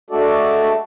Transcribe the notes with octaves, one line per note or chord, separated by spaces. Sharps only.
G#3 A3 D4 F#4 A4 D5